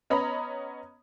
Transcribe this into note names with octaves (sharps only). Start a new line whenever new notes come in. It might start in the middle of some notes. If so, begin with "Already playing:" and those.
B3 C#4 D#5 A#5 B5